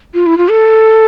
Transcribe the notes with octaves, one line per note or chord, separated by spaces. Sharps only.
F4
E4
F4
A4